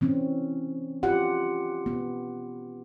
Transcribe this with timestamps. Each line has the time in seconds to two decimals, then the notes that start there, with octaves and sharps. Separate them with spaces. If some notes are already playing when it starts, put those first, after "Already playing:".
0.01 E3 C4 C#4
1.03 F4 G4 F#5
1.86 B3